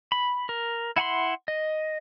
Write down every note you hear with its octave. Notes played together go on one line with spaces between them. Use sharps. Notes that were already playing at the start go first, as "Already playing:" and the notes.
B5
A#4
E4 F#5 G#5 B5 C6
D#5